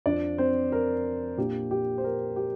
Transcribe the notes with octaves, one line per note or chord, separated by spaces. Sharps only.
F2 F3 D4 D5
C4 C5
A#4
A#2 A#3 D4 G4
G4
C5
A#4
G4